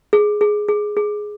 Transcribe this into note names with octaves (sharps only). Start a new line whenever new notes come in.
G#4
G#4
G#4
G#4